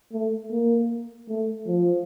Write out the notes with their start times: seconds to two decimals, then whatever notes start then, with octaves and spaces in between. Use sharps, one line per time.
0.13 A3
0.51 A#3
1.29 A3
1.67 F3